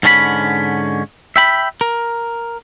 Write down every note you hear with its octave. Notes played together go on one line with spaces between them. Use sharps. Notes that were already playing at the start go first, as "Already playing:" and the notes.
G#2 D3 C#4 A#5 B5
E5 G5 B5
A#4